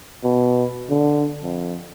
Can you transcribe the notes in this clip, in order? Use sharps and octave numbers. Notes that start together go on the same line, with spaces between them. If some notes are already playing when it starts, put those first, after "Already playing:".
B2
D3
F2